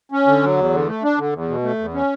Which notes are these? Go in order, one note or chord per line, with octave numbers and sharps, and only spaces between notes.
C#4
D3
F#3
E2
D3
A3
D4
D3
E2
B2
A3
E2
C#4